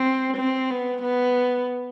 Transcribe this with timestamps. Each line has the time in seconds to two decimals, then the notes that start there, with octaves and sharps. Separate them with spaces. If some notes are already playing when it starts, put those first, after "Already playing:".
Already playing: C4
0.37 C4
0.70 B3
1.03 B3